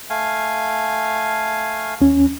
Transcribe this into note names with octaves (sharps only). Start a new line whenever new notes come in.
A3 F5 G#5
D#2 C#4